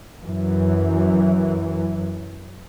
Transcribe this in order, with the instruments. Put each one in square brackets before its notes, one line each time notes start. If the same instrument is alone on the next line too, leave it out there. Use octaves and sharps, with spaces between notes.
[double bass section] F#2 E3